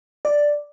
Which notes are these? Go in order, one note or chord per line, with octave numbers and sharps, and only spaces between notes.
D5